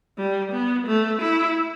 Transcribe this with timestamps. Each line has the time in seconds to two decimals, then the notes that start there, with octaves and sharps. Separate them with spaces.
0.18 G3
0.52 B3
0.87 A3
1.22 E4